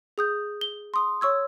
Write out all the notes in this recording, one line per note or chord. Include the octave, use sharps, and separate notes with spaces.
G#4 D#6 G6
G7
C6 D#6
C#5 C#6 E6 G#6